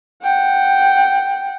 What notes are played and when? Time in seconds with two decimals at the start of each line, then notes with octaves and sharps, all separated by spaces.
0.23 F#5 G5